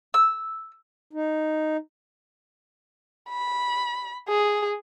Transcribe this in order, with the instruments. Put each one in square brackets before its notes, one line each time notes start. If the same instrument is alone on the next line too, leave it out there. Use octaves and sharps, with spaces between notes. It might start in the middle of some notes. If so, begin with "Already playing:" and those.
[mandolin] E6
[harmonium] D#4
[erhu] B5
G#4